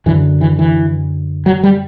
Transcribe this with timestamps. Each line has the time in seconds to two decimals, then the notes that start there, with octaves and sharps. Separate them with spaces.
0.06 F#2 D3 E3
0.41 E3
0.59 E3
1.46 F#3
1.63 G3